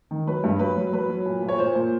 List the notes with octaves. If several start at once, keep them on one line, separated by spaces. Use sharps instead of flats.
D#3
F#3 B4
G2
F#3 B4
F#3
F#3 B4
F#3
A#2
A#2
C#5
A#2 C5
A#2